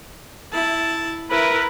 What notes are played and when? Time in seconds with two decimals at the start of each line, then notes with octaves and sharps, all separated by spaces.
0.53 E4 A5
1.31 E4 A#4 B4